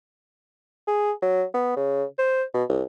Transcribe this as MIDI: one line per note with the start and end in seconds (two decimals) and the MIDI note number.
0.87 1.12 68
1.22 1.44 54
1.54 1.76 59
1.77 2.04 49
2.18 2.44 72
2.54 2.64 47
2.69 2.83 36